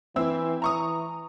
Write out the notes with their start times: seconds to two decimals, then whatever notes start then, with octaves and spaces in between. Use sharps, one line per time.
0.16 E3 C4 E4 E6
0.62 E3 A#5 C#6 D#6